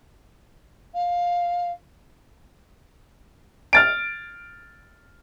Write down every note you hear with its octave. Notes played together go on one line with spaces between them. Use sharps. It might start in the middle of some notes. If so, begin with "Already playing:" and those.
F5
F6 A6 D7